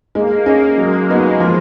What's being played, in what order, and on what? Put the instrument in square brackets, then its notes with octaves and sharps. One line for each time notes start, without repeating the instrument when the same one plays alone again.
[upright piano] G#3 [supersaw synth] A#3
[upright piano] C#4 G#4 D#5
[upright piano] F#3 [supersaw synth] G#3
[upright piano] B3 D#4 F#4
F3